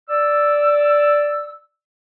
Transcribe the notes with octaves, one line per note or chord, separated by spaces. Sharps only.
D5 E6